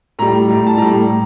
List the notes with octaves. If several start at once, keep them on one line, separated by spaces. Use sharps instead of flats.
A2 G3 A#5
A2 G3
A5
A2 G3 A#5
A2